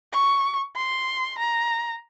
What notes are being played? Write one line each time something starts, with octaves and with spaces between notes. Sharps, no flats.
C#6
C6
A#5